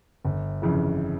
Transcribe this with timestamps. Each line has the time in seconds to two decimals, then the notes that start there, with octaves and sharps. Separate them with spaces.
0.25 G1
0.62 F2 C#3 E3